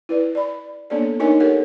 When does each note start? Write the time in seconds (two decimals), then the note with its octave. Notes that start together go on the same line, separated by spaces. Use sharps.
0.09 E4 B4 D5
0.35 D5 B5
0.90 A#3 B3 D4 A4 C#5 D5
1.20 D4 D#4 A#4 C#5 D#5 G#5
1.40 G4 A4 A#4 C#5 F#5